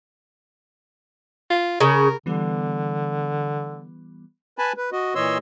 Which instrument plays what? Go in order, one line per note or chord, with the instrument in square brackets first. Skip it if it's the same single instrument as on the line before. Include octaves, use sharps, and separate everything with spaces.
[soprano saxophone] F4
[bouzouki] C#3 [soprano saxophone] A#4
[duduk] D3 [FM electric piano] E3 G3 B3
[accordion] B4 G#5 A5 B5
B4
F#4 D#5
A#2 E3 C#5 D#5 C6 E6